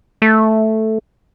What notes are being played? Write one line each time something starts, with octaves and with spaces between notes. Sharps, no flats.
A3